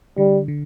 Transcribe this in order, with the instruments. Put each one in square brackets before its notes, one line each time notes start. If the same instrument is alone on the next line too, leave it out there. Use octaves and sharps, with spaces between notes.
[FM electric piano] D3 [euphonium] G3
[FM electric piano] D3